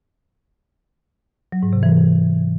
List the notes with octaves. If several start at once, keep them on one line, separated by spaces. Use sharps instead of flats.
F#3
G#2
C3
E3